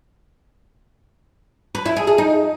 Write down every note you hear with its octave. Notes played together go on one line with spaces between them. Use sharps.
B4
E4
G#4
G#4
D#4